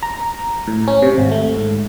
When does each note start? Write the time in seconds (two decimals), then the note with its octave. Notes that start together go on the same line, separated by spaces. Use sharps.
0.03 A#5
0.67 A2
0.88 C#4
1.02 C3
1.18 G#1
1.31 A3
1.56 G#2